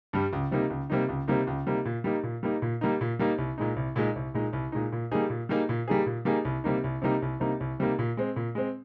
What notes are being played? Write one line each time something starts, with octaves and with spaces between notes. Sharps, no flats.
G2 G3
C#2
C3 G3 A#3 D#4
C#2
C3 G3 A#3 D#4
C#2
C3 G3 A#3 D#4
C#2
C3 G3 A#3 D#4
A#2
G3 A#3 D#4
A#2
G3 A#3 D#4
A#2
G3 A#3 D#4
A#2
G3 A#3 D#4
C2
A#2 G#3 D#4
C2
A#2 G#3 D#4
C2
A#2 G#3 D#4
C2
A#2 G#3 D#4
A#2
G3 A#3 D#4 G#4
A#2
G3 A#3 D#4 G#4
A#2
G3 A#3 D#4 G#4
A#2
G3 A#3 D#4 G#4
C2
C3 G3 A#3 D#4
C2
C3 G3 A#3 D#4
C2
C3 G3 A#3 D#4
C2
C3 G3 A#3 D#4
A#2
G#3 C4
A#2
G#3 C4